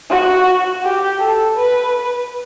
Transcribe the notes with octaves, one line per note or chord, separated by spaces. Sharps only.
F#4
G4
A4
B4